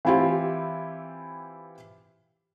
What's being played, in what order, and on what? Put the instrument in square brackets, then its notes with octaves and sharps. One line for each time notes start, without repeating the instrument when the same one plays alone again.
[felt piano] E3 C4 E4 F4 G4